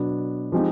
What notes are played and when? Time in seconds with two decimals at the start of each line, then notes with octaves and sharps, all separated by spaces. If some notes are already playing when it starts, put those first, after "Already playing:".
Already playing: B2 F#3 B3 D4
0.52 F3 G#3 C4 D#4 G4